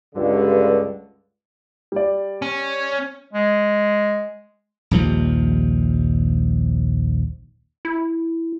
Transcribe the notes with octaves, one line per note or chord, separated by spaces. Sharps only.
C#2 G2 D3
G3 D5
C#4
G#3
A#1 D#2 F3 G3
E4